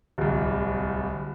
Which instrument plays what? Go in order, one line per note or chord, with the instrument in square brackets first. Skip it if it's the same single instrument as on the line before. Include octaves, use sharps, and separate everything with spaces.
[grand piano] D1 C2